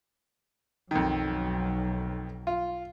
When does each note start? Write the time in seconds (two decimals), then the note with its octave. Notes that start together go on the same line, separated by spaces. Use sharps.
0.91 B1 F2 D#3 F#3
2.47 F4